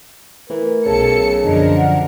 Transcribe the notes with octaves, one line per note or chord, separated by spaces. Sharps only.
E3 A3 A#4
B1 C#3 A4 C#7
F#2 D3 F3 D4 A#4 D#5
F#5